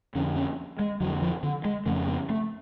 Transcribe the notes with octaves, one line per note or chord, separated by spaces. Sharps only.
F2 D3 C#4
C#4
G#3
F2 D3 F#3
F3
D3
G#3
F2 C#3 A3
B3
A3